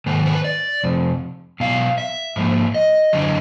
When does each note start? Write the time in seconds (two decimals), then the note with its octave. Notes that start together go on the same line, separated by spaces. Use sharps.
0.06 G#2 D#3 B4
0.26 B4
0.44 D5
0.84 F2 C3
1.60 B2 F#3 B3 F5
1.98 E5
2.36 G#2 F3 A#3
2.74 D#5
3.13 F#2 D3 F#3